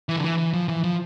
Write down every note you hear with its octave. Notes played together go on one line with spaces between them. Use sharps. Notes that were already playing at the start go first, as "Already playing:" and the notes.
E3
D3
E3
E3
F3
E3
F3